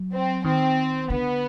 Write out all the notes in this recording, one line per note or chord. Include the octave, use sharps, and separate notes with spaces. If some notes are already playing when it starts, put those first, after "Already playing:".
Already playing: F#3
C4
D#3 C4
D3 B3